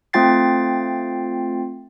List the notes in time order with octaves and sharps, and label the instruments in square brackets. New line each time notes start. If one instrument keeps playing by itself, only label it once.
[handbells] A3 C4 F4 G5 A6 C7